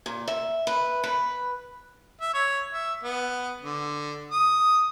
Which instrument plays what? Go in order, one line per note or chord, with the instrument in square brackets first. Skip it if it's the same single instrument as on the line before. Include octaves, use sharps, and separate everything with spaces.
[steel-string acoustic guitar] A#2
E5
B4
B4
[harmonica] E5
C#5
E5
B3
D3
D#6